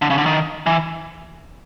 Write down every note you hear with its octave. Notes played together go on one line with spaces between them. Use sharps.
D3
C#3
D3
D#3
E3